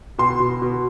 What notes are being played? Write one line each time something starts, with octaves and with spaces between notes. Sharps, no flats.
B2 C6
B2
B2